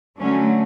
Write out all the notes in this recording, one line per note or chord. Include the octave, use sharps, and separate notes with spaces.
D3 F#3 A3 C#4